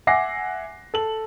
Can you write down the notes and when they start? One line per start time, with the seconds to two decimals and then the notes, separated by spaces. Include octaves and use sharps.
0.07 E5 F#5 G#5 D6 A#6 C7
0.94 A4 F#7